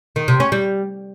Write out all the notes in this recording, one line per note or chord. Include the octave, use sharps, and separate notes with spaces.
D#3
C3
C#4
G3